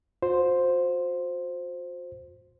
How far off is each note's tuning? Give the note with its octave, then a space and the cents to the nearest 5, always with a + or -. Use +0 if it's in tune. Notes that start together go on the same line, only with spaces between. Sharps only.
F#4 -45 C5 +0